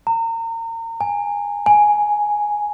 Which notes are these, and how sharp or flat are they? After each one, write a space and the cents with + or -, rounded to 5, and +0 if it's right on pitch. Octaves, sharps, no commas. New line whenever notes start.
A#5 -35
G#5 -15
G#5 +5